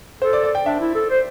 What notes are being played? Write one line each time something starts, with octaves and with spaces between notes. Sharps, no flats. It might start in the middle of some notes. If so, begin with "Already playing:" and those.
A4 C5
D5
D5
G5
D4 E5
E4
A4
C5